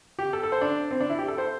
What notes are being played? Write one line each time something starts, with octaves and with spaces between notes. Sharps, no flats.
G4
A4
A4
C5
D4
C4
D4
E4
G4
A4
C5